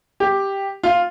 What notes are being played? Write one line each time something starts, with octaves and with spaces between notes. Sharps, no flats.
G4
F4